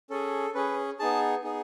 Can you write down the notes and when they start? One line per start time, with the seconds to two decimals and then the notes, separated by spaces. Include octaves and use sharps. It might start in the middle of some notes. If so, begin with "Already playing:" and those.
0.10 C#4 G#4 A4
0.55 C#4 G#4 B4
0.99 B3 D#4 G#4 A5
1.44 B3 D#4 G#4